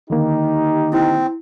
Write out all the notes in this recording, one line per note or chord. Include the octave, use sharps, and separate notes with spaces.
D3 D#3 A#3 D#4 G4
C4 E4